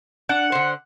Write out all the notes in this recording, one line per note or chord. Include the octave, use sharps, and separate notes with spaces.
D4 F#5
D3 C5